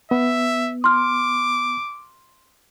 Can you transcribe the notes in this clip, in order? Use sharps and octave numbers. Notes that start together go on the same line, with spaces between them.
B3 E5
C6 D6 F6